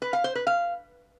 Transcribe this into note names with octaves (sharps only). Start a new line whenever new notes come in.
B4
F5
C5
B4
F5